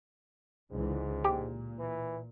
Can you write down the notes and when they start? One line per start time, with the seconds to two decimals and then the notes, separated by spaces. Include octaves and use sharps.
0.71 C#2 G#2 D3 E3
1.24 A#2 G4
1.79 E3